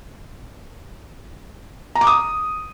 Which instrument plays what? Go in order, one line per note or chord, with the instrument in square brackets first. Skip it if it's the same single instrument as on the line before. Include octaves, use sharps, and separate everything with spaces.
[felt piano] A#5
D6
D#6